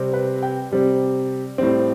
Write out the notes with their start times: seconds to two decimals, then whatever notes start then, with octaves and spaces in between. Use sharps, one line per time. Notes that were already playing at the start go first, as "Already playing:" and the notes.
Already playing: C3 G3 C4
0.13 B4
0.43 G5
0.72 C3 G3 C4
1.58 A2 G3 C4